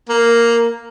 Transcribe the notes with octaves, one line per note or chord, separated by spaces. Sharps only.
A#3